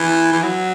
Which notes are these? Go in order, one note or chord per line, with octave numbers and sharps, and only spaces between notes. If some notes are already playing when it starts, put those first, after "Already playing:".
Already playing: E3
E3
F#3